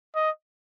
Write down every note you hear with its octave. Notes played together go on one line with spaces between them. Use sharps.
D#5